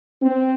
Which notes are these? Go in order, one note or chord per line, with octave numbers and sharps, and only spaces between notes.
C4